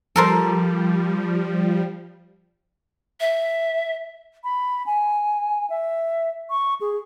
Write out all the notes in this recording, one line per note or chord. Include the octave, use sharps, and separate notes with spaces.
F3 G3 A4 A#4 C5
E5
B5
G#5
E5
C#6
G#4